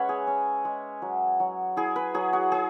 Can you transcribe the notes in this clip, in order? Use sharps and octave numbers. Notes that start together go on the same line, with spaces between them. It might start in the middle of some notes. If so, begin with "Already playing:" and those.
Already playing: G#3 C#4 B4 C#5 E5 F#5
G#4
C#4
G#3
F#3
F#3
E4 G#4
B4
F#3 G#4
F#4
F#3 G#4